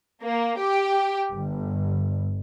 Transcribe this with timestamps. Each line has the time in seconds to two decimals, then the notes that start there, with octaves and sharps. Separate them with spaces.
0.23 A#3
0.59 G4
1.34 G1